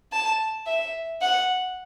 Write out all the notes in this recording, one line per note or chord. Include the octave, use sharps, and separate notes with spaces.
A5
E5
F#5